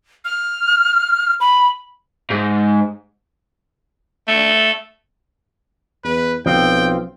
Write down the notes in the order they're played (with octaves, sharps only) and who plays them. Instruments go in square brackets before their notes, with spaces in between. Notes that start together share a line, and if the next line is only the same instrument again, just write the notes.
[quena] F6
B5
[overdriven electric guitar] G#2
[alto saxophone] A3
[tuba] E2 [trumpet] B4
[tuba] B1 [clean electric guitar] F3 C4 F4 [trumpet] G5